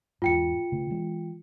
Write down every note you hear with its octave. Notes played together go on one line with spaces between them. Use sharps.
E2 G#2 F4 G5 C#7
C#3 A3
E3 G#3